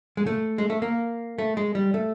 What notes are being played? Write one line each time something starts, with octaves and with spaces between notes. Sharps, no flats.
G#3
A3
G#3
A3
A#3
A3
G#3
G3
A3